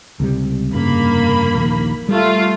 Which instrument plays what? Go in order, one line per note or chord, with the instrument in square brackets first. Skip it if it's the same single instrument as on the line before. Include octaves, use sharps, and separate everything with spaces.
[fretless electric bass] C#2 C3 G3
[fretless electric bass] F1 G2 C#3 [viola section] A#3 B5
[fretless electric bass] A#1 D#2
[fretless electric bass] G3 [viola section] A3 F4